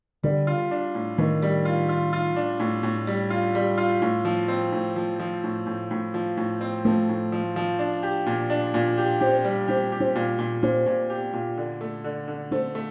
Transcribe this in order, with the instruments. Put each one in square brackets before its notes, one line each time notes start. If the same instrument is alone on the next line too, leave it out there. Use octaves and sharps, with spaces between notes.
[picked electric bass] D3 [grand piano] G3
[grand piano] F4
D4
A2
[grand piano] A2 [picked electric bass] D#3
[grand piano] G3
F4
F4
F4
D4
A2
A2
G3
F4
G3
F4
A2
F3
C4
A2
F3
F3
A2
A2
A2
F3
A2
C4
[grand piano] F3 [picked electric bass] A3
[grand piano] A2
F3
F3
D4
G4
A#2
D4
A#2
G4
[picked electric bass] C4 [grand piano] G4
[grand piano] G3
[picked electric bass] C4 [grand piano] G4
[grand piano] G4
[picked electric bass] C4
[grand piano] A#2
A#2
[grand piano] A#2 [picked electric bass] C4
[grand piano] A#2
G4
A#2
D3
A3
D3
D3
[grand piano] A3 [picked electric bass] C4
[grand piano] A3